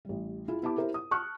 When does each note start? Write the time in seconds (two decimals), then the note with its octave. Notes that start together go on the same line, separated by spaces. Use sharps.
0.05 A1 G3
0.48 E4 F4 G#4
0.63 B3 E4 G4 A5 D6
0.77 E4 G4 A#4 C5 E5
0.94 D#6
1.11 A5 C#6 F6 F#6